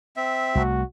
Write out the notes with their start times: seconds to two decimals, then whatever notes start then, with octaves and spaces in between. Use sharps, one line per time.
0.17 C4 E5
0.55 C2 A3 F#4